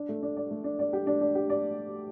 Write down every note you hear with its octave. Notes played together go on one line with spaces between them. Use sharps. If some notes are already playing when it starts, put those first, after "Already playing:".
Already playing: D4
A3
D4
D5
A3
D4
D5
G4
D4
D4
G4
D5